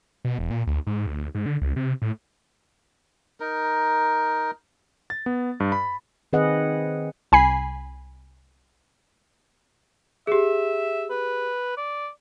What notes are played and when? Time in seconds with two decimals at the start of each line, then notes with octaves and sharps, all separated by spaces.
0.25 B2
0.39 E1
0.51 A#2
0.67 D2
0.87 G#2
1.07 D2
1.35 G#2
1.46 D3
1.61 C#2
1.76 C3
2.02 A2
3.40 D#4 A#4
5.10 A6
5.26 B3
5.60 G2
5.72 B5
6.33 D#3 C4 G#4 B4 D#5 F#5
7.32 C2 G#5 B5 C7
10.27 G4 G#4 E5
11.10 B4
11.77 D5